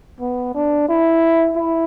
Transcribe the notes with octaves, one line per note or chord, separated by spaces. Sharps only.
B3
D4
E4
E4